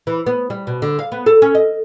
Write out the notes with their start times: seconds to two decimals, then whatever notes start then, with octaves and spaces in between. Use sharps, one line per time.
0.07 E3
0.26 B3
0.50 G3
0.67 B2
0.82 D3
0.99 F5
1.12 B3
1.26 A4
1.42 C#4
1.55 D#5